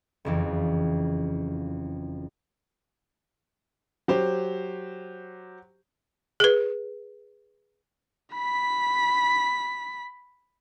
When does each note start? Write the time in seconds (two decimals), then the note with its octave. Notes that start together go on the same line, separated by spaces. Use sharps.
0.25 F#1 F2 E3
4.08 F#3 G4 C5
6.40 G#4 B4
8.36 B5 B6